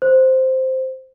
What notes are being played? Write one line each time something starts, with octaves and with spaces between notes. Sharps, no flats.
C5